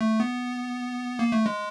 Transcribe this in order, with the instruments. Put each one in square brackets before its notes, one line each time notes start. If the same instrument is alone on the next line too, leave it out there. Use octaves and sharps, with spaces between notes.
[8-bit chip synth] A3
B3
A#3
A3
G#3